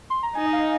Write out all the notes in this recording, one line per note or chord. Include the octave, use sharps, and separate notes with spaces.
C6
A#5
D#4 G#5
D#5
F5